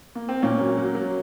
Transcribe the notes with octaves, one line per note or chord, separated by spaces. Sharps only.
A#3
C4
A#2 A#3 C#4
F#3
F#3
F#3